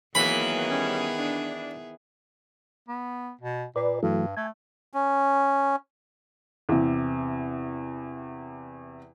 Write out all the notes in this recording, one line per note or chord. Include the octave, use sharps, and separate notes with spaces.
D#3 E3 F#3 A#3 B3 G#4 B5
G3 C#4
D4
B3
B2
A#2 B4 D5
G2 E3 F#3 A3
A3 G#5
C#4
E2 C3